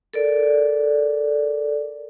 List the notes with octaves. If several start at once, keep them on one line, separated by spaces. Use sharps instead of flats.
A4 A#4 D5